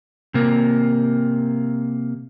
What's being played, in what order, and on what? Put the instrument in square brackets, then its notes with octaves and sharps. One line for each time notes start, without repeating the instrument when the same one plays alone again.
[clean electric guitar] C3 A#3